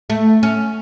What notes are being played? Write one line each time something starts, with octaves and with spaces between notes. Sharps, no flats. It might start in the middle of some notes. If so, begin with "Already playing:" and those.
A3
C#4